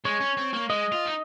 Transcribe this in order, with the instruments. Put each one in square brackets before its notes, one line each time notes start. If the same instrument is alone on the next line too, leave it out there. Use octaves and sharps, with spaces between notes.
[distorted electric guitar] G#3 [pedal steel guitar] C#5
[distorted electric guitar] C#4
C4
A#3
[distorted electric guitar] G#3 [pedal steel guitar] D#5
[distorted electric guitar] F4
D#4